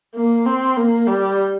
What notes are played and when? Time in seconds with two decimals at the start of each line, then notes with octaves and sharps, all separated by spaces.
0.15 A#3
0.46 C4
0.76 A#3
1.07 G3